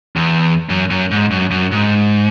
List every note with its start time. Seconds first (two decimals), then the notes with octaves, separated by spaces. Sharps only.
0.16 E2
0.69 F#2
0.90 F#2
1.11 G#2
1.31 F#2
1.51 F#2
1.72 G#2